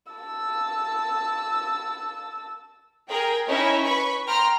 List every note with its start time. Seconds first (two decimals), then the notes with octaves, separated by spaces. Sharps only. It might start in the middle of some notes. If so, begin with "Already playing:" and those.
0.12 A5 E6
3.09 G#4 A#4 G5
3.48 C#4 D#4 E4 D#5
3.84 B4 B5 C#6
4.27 G5 A#5 C6 F6